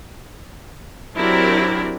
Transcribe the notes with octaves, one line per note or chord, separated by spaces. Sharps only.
F#3 C4 D4 E4 G4 A#4